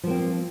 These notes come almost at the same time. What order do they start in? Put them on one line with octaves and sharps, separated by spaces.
F3 A#3 C4